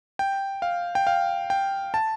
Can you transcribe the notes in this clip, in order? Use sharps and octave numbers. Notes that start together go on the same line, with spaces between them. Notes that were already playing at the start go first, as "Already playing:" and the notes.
G5
F5
G5
F5
G5
A5